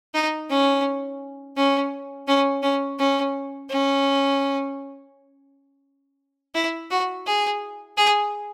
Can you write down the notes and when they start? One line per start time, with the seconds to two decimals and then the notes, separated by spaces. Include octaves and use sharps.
0.14 D#4
0.50 C#4
1.57 C#4
2.28 C#4
2.63 C#4
2.99 C#4
3.70 C#4
6.55 E4
6.90 F#4
7.26 G#4
7.97 G#4